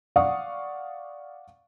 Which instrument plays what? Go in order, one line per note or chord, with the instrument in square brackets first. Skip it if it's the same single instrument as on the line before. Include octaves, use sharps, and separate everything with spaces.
[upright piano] D5 F5 F#5 C#6 D#6